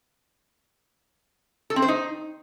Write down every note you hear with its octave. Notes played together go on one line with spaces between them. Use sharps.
A4
C4
C5
D#4